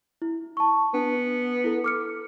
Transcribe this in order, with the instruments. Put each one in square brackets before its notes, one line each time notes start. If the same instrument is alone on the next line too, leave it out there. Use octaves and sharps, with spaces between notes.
[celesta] E4
A5 C#6
[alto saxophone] B3 [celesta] D4
[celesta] E4 A4
D6 F6 C#7